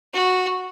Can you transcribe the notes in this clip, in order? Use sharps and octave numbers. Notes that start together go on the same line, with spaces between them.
F#4